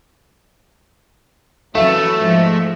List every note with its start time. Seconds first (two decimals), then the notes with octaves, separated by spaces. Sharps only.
1.75 E3 F#3 A3 C#4 E5
2.17 G#2 F3 G#3